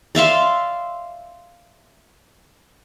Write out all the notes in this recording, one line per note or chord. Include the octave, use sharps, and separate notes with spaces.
D5 E5 F5 C6